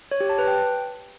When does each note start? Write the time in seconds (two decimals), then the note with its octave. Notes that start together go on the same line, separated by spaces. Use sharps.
0.11 C#5
0.20 G4
0.29 A5
0.39 B4
0.48 G5